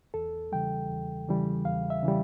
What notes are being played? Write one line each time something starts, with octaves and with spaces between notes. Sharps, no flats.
E2 A4
C#3 E3 G3 G5
E2
C#3 E3 G3
E2 F5
E5
C#3 E3 G3